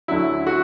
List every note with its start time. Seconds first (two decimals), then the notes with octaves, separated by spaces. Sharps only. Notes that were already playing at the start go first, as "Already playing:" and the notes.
0.08 D2 D3 F#3 E4
0.47 F#4